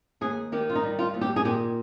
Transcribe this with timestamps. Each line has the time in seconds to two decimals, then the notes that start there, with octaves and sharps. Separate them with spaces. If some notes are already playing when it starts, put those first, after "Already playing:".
0.21 D#2 G#4
0.52 D#3 G4
0.69 F4
0.75 D#4
0.83 G3
0.99 F4
1.14 D#2
1.21 G4
1.36 G#4
1.45 A#2 G4